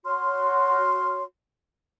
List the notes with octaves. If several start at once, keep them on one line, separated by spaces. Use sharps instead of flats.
F#4 C#5 C6 F6